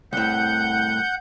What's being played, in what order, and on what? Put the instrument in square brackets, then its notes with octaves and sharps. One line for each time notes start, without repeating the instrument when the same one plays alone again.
[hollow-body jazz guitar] C2 A2 [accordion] F#5 G6